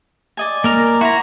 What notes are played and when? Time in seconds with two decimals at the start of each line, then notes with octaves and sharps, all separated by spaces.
0.37 D5 D#5 G#5
0.64 A#3 A#4 A#5
1.01 E4 F#4 A#5 C6